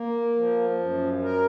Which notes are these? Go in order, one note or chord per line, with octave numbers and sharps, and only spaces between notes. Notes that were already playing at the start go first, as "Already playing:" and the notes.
Already playing: A#3
F3
F#2
A#4